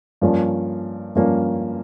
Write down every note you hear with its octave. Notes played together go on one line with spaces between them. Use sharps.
G2 F3 A#3 C#4
G2 F3 A#3 C#4